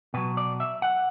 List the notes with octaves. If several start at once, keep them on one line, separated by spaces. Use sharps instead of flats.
B2 F#3 B4
D5
E5
F#5